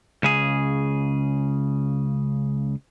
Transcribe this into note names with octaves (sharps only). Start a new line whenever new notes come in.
C#2 C#3 G#4